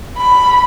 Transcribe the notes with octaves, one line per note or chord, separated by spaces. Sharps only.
B5